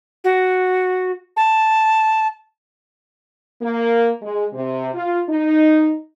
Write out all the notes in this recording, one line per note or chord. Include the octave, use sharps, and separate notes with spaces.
F#4
A5
A#3
G#3
C3
F4
D#4